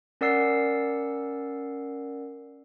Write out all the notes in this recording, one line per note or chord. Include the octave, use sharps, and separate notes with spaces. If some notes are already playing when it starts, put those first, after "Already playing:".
C#4 A#4 D5 F#5 E6 C7